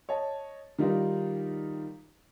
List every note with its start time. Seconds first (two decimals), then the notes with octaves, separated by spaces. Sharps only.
0.09 C#5 D#5 A5
0.79 D#3 G3 D#4 F4 A#4